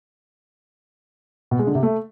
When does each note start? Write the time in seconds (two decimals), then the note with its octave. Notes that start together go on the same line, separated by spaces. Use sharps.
1.51 B2
1.59 G#3
1.67 D3
1.75 C3
1.83 A3